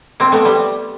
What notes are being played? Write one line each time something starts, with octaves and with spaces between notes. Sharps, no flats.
A#3 C4
A3 B3
G3